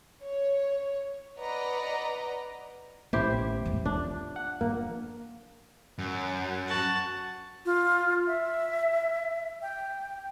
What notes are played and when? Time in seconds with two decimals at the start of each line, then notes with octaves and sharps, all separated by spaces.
0.23 C#5
1.39 B4 D5 D#5 F#5 A#5
3.13 A1 A2 E4 G4 C5
3.66 E2 G#3
3.86 D4 F4
4.36 F#5
4.61 F3 A#3
5.98 F#2
6.68 F#4 A5
7.66 F4
8.27 E5
9.62 G5